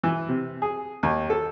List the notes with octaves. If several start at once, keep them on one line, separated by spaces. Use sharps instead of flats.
E3
C3
G#4
D#2
A4